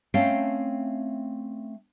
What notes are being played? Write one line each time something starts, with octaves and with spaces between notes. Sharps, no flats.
A3 C4 C#4 F5 G5